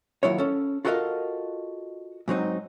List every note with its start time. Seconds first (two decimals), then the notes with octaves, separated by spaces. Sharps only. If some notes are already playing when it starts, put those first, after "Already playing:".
0.23 D#2 F#3 E4 F4 C#5
0.38 C#4 A4
0.85 F4 F#4 A4 A#4 D#5 F5
2.28 G#2 F#3 C4 D#4